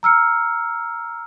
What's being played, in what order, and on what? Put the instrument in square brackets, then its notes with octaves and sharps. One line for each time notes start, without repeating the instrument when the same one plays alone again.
[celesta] A#5 E6 F6 C#7